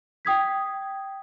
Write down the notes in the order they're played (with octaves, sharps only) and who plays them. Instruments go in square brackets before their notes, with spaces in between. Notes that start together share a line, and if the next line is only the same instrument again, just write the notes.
[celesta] G5 D#6 G#6 B6